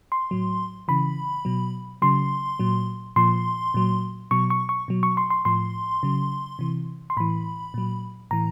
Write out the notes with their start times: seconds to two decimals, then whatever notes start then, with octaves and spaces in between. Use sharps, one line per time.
0.12 C6
0.31 A2 F#3
0.88 C#3 E3 B5
1.45 B2 F#3
2.02 C#3 F#3 C6
2.59 A#2 F#3
3.16 A#2 F3 C6
3.74 A#2 F#3
4.31 B2 F#3 C#6
4.50 C#6
4.69 C#6
4.88 B2 F#3
5.03 C#6
5.17 C6
5.30 C6
5.45 A2 F3 C6
6.03 C#3 F#3
6.59 C3 E3
7.10 C6
7.17 A2 E3 B5
7.74 A#2 F#3
8.31 A2 E3 A#5